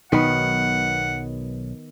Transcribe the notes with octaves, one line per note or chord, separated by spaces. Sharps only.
B1 B2 D#3 F#3 B3 F#5